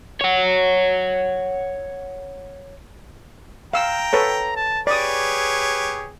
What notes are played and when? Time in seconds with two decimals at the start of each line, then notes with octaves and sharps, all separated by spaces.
0.21 C#5 F#5
3.73 F5 G5 A#5 E6
4.13 A4 B4 C#5
4.56 A5
4.87 G4 G#4 B4 C#5 D5 D#6